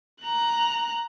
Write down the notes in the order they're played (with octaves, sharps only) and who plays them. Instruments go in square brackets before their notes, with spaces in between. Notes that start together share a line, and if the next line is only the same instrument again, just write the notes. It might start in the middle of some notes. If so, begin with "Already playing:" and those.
[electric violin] A#5 F#6